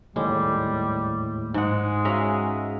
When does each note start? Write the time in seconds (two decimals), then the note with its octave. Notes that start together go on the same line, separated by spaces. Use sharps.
0.16 D#2 A2 G3 G#3
1.54 G#2 G#3 F#5
2.05 C#4 F#4 G#4 E5 F5 A#5